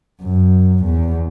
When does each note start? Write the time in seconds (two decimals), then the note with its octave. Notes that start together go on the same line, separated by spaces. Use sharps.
0.22 F#2
0.84 E2